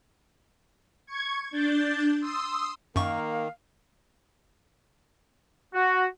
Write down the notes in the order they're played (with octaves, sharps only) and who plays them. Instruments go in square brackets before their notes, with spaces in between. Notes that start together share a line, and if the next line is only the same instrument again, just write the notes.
[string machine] C#6 G#6
D4 G6 A6
C6 D#6 E6
[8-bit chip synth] F#2 C#6 [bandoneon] D#3 [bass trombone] A#3 [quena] F5
[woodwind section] F#4